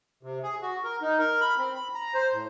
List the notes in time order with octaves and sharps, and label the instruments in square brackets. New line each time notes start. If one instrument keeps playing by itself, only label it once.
[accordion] C3
G#4
F#4
A#4
D#4
A#4
B5
C4
B5
A#5
C5
A2